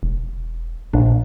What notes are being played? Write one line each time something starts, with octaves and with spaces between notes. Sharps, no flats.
E1
A#1 D4